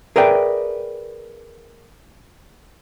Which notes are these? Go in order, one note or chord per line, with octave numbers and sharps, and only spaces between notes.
G#4 A#4 B4 D5 E5 G5